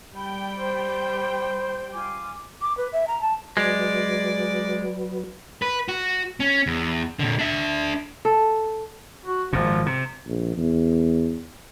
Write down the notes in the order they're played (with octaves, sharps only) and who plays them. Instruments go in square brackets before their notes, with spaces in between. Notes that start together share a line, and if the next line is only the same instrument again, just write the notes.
[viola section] G3 G5 [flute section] B5
[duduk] C5
[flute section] F4 G#5 D6
[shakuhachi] D6
B4
E5
A#5
A5
[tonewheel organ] F#3 F#4 B4 [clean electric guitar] G#3 [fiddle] D5
[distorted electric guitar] B4
F#4
C#4
E2
A#2 D3
D4 E5
[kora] A4
[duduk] F#4
[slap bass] G#1 A#2 [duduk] F3
[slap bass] C3
[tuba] A#1
E2